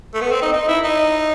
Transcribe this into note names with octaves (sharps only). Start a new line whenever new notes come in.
A3
B3
C4
D#4
D#4
E4
D#4